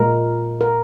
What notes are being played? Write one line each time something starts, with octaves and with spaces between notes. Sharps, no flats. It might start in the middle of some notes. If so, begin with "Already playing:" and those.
Already playing: A#2 G#3 A#4
A#4